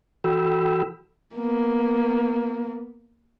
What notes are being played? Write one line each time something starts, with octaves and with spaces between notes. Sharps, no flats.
E3 F#4 A4 G5 B5 E6
A#3 B3